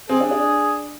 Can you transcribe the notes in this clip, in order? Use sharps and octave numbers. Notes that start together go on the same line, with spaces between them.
C4 G#4
D4
D4